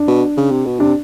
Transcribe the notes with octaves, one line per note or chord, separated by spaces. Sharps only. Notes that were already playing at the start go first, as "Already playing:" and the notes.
Already playing: D4
B2
C#3
C3
B2
C3 D4